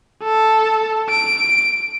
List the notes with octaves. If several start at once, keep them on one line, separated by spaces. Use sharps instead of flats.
A4
D7